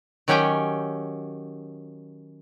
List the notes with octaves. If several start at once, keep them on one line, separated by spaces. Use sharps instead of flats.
D#3 F#3 C#4 G4 G5 G#5